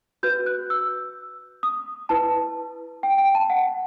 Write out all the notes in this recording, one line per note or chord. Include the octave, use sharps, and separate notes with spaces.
F#4 B4 G6
F#6
E6
D#6
E4 B4 A5
G5
G5
A5
F#5